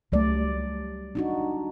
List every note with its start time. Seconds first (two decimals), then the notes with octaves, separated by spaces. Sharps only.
0.12 C#2 F#3 G3 A3 D5
1.15 D4 D#4 F#4